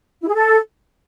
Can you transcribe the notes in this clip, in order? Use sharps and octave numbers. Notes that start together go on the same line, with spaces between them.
E4
G#4
A4